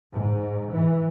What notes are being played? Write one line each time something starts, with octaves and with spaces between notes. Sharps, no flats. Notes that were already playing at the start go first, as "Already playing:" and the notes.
G#2
E3